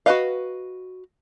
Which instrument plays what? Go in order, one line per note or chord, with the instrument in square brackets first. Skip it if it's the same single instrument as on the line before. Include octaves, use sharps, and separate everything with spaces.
[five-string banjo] F#4 G#4 B4 D#5 F5